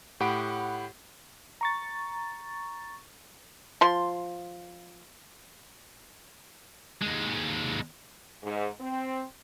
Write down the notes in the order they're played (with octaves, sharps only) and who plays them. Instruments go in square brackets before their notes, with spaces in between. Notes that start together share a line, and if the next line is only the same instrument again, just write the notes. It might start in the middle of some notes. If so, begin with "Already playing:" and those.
[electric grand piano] A2 G4 F#5 B5 D7
[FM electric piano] A#5 C#6 A6
[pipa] F3 C6
[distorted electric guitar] D#2 G#3
[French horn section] G#2
C4